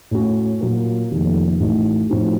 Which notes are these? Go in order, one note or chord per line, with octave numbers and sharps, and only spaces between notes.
A2 A3 C#4 F#4
A#2 F#3 A#3
F1 F2 D#3 A#3
A1 A2 A3 D#4 F#4
A2 F3 C4 D#4 F#4